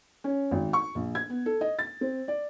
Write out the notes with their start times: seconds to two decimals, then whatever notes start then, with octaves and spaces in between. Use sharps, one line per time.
0.24 C#4
0.51 G#1
0.73 C#6
0.95 A#1
1.15 G#6
1.30 B3
1.46 A4
1.61 D#5
1.79 A6
2.01 C4
2.28 D5